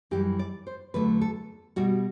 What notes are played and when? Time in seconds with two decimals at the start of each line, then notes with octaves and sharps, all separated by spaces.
0.11 F#2 E3 G3 G4
0.39 D5
0.67 C5
0.94 E2 D3 F#3 A3 B4
1.21 A4
1.76 B2 G3 F#4